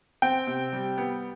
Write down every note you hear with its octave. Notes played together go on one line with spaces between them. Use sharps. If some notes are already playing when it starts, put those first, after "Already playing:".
C4 G5
C3
G3
B3